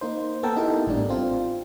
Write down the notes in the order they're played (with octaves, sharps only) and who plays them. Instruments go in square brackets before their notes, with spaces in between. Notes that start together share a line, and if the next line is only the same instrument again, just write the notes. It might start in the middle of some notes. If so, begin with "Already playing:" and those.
[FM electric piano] A#3 D#4 C5
A#3 B3 A4 A#4 G5 A5
B3 D#4 E4 G4 A4 A#4
G#1 A2 G3 D4
C4 F4